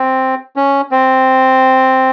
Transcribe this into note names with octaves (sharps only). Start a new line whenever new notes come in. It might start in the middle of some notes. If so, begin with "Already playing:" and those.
Already playing: C4
C#4
C4